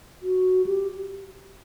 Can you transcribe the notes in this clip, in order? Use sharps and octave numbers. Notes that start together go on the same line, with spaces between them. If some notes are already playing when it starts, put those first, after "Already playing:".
F#4
G4